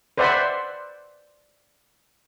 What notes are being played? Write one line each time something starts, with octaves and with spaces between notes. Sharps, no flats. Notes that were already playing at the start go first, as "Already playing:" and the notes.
B4 C5 D5 E5 F#5 C6